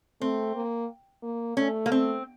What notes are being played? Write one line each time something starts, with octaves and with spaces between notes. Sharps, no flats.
A3 C4
A#3
A#3
A3 C#4
A#3
C4